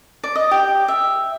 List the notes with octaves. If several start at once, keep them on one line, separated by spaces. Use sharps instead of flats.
D5
D#5
G4
E5